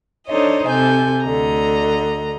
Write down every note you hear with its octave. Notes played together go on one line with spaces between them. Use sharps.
D4 D#4 A4 C5 C#5 D#5
C3 A4 G#5 G6
D2 D3 D#5 A#5